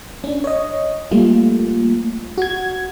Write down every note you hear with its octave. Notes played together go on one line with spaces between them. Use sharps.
C#4 D4
C#5 D#5
G3 A3 A#3 F4
F#4 G#6